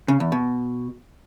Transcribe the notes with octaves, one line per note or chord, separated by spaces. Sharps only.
C#3
E2
B2